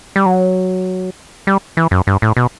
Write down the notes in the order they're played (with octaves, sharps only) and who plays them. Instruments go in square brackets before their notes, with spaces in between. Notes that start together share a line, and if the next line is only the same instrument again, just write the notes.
[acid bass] G3
F#3
G3
E3
F#2
G2
A2
B2